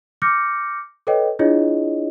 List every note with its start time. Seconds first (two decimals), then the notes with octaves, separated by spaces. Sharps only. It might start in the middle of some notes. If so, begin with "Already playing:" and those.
0.22 D6 F6 G6 A#6 C#7
1.07 A4 B4 C#5 D#5 G5
1.39 D4 E4 F4 G#4 C#5 D#5